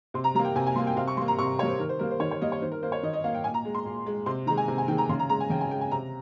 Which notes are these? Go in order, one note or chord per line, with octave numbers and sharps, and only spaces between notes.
C3 C6
A#5
G3 A#3 A#5
G5
C3 G#5
G#5
G3 A#3 C6
G5
C3 F5
C#6
G3 A#3 C6
A#5
C3 C#6
G3 A#3 C#5
C5
D#3 A#4
C5
G3 A#3 A#4
C5
D#3 C#5
C#5
G3 A#3 D#5
C#5
D#3 C5
A#4
A#3 C5
C#5
D#3 D#5
D#5
A#3 F5
G5
A#2 G#5
A#5
G#3
C6
A#2
G#3
C3 C6
D#3 G#3 A#5
G#5
C3
G#5
D#3 G#3 G5
A#5
C#3 C6
A#5
G#3 A#5
G#5
C#3 G5
G#5
G#3 G5
G#5
C3 A#5